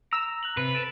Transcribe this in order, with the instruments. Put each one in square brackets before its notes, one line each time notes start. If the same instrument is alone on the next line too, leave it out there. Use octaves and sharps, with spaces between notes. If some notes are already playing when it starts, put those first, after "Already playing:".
[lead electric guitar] A#5 [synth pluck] E6
[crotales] F#6 F7 F#7
[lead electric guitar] C3 [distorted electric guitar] B4
[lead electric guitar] A4 [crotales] D7 E7